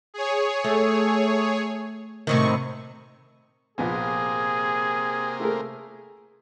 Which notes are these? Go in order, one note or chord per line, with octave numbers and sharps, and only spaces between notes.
G#4 C#5
A3
A2 C3 D#3 C#6
A#1 C3 A#3 B3 G#4 G#5
A3 G#4 A#4